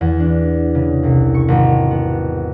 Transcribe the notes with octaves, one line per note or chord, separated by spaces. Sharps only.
E2
D4
C#3
C2
C#6
G#1
B3